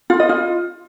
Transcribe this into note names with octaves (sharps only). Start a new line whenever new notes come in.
F4
D#5
F4